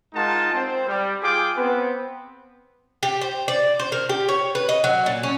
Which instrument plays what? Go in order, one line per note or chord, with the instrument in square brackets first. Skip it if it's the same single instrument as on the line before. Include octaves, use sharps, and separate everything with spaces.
[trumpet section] G#3 D#4 F4 A#4 F#5 A5
C4 C5
G3
F4 G#4 G5 D6
B3 C4 B4
[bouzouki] G4
C5
D5
C5
A#4
G4
C#5
B4
D#5
F#3
A#2
C#4